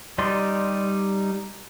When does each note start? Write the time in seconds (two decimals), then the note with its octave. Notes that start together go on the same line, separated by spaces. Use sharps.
0.18 G3 D#4 D5 C6